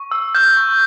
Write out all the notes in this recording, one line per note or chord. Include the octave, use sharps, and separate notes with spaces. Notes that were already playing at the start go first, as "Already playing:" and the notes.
Already playing: C#6
E6
F6 G6
C#6